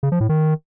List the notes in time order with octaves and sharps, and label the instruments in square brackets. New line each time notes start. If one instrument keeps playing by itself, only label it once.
[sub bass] C#3
F3
A2
D#3